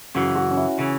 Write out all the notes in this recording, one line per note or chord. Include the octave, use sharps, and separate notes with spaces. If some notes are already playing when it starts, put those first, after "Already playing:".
F#2 C#3 E3 F#4
F#4
C#4
E4
C#3 E3 C#4